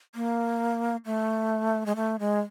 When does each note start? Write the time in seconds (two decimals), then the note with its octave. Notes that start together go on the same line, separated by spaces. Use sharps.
0.15 A#3
1.06 A3
1.86 G#3
1.96 A3
2.19 G#3